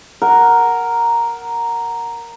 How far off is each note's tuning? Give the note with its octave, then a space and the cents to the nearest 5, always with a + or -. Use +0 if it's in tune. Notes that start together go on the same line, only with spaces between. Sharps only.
A#4 +0 F#5 +0